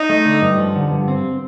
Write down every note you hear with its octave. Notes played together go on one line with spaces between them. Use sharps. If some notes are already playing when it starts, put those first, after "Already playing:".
Already playing: D#4
A3
D3
G2
F3
D3
G2
C4